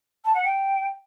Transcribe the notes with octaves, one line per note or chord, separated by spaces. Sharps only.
A5
F#5
G5